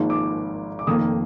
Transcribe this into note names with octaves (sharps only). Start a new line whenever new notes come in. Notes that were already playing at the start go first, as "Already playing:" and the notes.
Already playing: G#1 G#2 F3 A#3
D6
D6
F1 F2 D#3 A#3 D#6